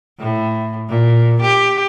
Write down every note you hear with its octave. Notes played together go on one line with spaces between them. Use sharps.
A2
A#2
G4